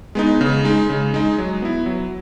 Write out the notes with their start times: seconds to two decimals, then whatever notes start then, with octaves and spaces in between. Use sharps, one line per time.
0.15 G#3 B3 D#4
0.41 C#3
0.64 G#3 D#4
0.90 C#3
1.14 G#3 D#4
1.38 F#3
1.62 B3 E4
1.86 F#3